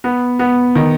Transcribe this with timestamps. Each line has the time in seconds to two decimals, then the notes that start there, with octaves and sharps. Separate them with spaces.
0.04 B3
0.39 B3
0.75 D#3